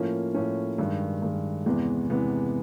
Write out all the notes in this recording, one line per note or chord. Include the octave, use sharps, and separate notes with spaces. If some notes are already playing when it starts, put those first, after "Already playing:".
Already playing: A2 F3 A#3 C#4
A2 F3 A#3 C#4
G2 D#3 G#3
G2 D#3 G#3
E2 C3 E3 G#3 B3
E2 C3 E3 G#3 B3